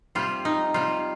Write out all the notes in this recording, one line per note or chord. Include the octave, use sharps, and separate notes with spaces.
C3 G3 F4
D#4
C3 G3 F4